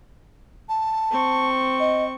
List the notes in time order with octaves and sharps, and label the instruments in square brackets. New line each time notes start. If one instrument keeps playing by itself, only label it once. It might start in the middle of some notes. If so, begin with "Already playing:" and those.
[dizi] A5
[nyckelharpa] C4 C#6
[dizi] D#5